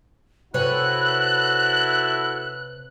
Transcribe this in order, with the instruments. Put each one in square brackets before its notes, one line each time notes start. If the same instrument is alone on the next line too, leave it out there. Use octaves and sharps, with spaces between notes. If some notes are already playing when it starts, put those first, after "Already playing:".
[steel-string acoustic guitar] C3 B4 C#5 [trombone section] E4 F#4 A4 [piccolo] F#6